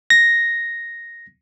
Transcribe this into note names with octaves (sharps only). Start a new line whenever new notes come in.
A#6